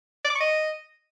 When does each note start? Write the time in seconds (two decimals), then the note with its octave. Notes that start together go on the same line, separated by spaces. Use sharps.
0.25 D5
0.30 D6
0.35 C#6
0.41 D#5